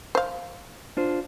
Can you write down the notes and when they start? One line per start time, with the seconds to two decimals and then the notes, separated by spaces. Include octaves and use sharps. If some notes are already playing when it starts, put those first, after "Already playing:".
0.15 C5 F5
0.97 D4 F4 C5